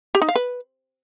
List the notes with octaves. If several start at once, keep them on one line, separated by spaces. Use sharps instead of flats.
G4
D#4
F5
B4